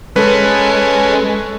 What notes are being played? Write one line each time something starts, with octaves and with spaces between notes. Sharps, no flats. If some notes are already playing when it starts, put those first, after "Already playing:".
G#3 C#4 A4 B4